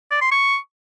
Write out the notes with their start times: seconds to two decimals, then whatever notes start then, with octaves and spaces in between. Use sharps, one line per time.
0.11 D5
0.21 C6
0.32 C#6